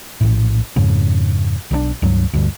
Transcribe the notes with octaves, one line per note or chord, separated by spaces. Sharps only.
A#1 A2
F2 G#2 C#3
B1 D#3 D4
C#2 G2 F#3
D2 G2